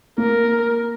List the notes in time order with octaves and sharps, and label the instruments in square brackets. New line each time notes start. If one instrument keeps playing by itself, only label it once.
[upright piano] A#3 [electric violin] A#4